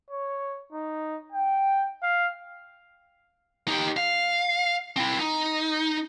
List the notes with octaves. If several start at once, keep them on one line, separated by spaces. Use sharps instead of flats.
C#5
D#4
G5
F5
D#4 G4
F5
C4 E4
D#4